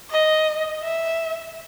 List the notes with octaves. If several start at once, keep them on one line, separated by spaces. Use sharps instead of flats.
D#5
E5